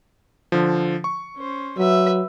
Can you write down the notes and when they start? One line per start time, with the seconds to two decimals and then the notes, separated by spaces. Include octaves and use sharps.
0.52 D3 F3
1.04 C#6
1.36 C#4 C5
1.78 F#3 B4 E5